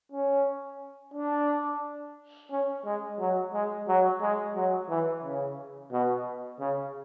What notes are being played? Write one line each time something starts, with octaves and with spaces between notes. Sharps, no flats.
C#4
D4
C#4
G#3
F#3
G#3
F#3
G#3
F#3
E3
C#3
B2
C#3